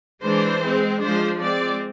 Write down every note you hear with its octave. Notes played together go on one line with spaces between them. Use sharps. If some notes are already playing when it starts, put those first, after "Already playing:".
E3 G#3 D4 C5
G#3 C4
F3 G#3 D4 C5
G#3 C4 D5